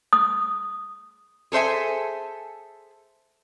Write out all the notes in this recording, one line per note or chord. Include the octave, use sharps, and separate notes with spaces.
D#6
G#4 A4 C5 E5 G#5